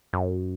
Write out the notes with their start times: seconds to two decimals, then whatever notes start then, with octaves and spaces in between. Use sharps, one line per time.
0.13 F#2